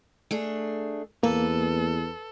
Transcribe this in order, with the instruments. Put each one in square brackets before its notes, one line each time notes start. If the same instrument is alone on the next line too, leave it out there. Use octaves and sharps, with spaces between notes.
[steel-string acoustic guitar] A3 D4 G#4
[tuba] E2 [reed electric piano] A#3 [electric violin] A4 [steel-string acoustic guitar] B4